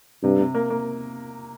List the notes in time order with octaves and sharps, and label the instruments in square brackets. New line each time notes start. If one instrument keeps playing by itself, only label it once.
[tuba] G2 [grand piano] C3
[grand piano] C3
A#3
A#3